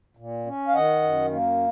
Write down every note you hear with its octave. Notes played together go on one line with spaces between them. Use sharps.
A#2
C#4
F5
D#3 D#5 F#5
F#2
A#3